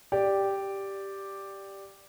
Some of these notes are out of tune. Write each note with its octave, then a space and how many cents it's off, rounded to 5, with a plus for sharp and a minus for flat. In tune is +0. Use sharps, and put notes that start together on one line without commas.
G4 +0 D5 +0